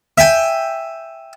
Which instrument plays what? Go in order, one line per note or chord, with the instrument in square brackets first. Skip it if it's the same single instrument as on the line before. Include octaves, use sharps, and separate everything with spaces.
[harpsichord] E5 G5 G#5